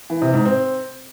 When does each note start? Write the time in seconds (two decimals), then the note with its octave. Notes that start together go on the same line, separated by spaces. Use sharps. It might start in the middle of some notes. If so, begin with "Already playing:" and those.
0.10 E3
0.22 C3
0.34 G#2
0.45 C4